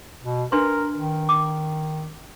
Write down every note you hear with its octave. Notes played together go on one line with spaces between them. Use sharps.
B2
D4 A#4 B4 C6
D#3
D6